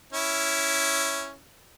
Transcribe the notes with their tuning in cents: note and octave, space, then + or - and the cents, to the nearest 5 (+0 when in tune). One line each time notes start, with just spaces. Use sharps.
C#4 +0 E4 +0